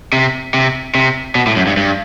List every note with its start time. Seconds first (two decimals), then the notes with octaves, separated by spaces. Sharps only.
0.13 C3
0.54 C3
0.95 C3
1.35 B2
1.47 A2
1.56 F#2
1.67 G2
1.77 G2